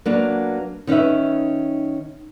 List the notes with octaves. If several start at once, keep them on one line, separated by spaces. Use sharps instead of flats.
F#3 A#3 B3 D4
D#3 C#4 D#4 B4 E5